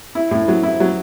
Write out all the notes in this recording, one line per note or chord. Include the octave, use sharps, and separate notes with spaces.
E4
A2
F#3
E4
F#3